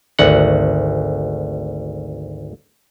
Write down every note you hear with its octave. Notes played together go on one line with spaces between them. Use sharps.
G#1 D2 F#5